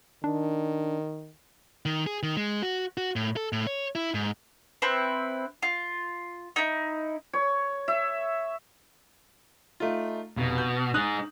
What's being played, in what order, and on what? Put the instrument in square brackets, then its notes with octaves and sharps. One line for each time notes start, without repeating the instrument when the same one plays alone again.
[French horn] D#3 [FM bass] D4
[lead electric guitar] D#3
G#4
D#3
G#3
F#4
F#4
A2
A4
A2
C#5
E4
G#2
[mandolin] C4 E4 B4
F4
D#4 E4
[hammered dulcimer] C#5
E5
[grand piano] A3 D#4 F4
[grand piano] F1 [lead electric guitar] B2
[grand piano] G6
[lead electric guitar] D#4 G#4 [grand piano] D#6 F#6